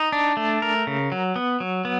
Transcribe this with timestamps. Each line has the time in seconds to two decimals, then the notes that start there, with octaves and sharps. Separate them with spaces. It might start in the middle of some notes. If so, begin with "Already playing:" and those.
Already playing: D#4
0.12 D4
0.37 A3
0.62 A#4
0.87 C#3
1.12 F#3
1.36 B3
1.60 F#3
1.85 B3